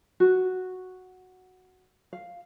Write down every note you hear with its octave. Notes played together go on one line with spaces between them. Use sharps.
F#4
F5